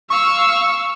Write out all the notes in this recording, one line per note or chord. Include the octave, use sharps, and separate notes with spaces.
F5 C#6 E6